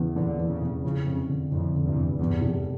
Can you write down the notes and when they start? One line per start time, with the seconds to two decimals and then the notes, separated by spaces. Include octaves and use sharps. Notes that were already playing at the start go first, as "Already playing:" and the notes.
Already playing: E2 C#3
0.16 E2 A#2 D3
0.38 E2
0.49 A2 C#3
0.61 F1
0.84 A2 C#3 F3
1.06 F2
1.29 D3
1.51 F2 A2 D3
1.75 D3
1.85 E2 G2
1.96 F1
2.19 F1 E2 G2
2.42 F1